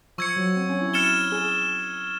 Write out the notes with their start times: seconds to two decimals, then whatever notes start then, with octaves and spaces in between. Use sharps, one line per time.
0.18 F3 C#6 E6 G#6 C#7
0.36 F#3
0.57 C4
0.69 C#4
0.82 E4
0.94 F6 A6 C#7 E7 G7
1.32 G#4